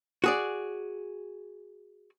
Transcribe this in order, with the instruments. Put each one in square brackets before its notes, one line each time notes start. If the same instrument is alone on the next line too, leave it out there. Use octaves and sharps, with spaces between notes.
[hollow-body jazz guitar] F#4 G#4 D5